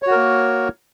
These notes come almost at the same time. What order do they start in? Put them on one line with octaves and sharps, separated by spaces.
C#5 F#4 A#4 A#3